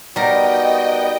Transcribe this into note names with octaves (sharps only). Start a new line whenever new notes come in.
G3 B3 D#4 F#4 A#4 D#5 G5